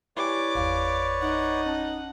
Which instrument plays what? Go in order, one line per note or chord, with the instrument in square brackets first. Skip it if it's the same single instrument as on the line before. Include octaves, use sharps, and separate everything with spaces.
[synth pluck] E4 G4 G#5 [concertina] B4 C#5 D5 [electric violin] D6
[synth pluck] G1 E2 [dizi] F5
[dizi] D#4 [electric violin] F#5
[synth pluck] C#4 A5